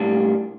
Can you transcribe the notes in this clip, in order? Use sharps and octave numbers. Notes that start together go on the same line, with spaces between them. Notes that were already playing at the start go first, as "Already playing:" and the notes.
Already playing: A2 G3 A#3 D4